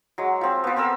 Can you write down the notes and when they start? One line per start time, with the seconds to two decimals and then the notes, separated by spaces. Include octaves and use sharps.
0.18 F#3 G#3
0.41 F3 C4
0.64 F3 B3
0.76 C4 A4 A#4 E6